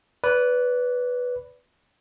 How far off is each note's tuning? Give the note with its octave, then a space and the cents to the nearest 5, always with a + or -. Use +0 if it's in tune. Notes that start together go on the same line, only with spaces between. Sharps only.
B4 +0 D5 -30